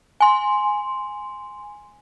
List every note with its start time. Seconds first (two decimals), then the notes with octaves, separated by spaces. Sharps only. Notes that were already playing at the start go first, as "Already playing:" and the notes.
0.20 G#5 C6